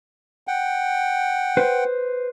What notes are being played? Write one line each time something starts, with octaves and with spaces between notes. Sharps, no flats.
F#5 G5
B4 C5